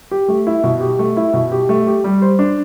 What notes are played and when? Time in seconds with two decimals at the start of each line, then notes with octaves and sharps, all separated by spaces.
0.11 G4
0.28 A3
0.47 E4
0.64 B2
0.81 G4
0.99 A3
1.17 E4
1.34 B2
1.52 G4
1.69 A3
1.87 G4
2.04 G3
2.22 C5
2.39 D4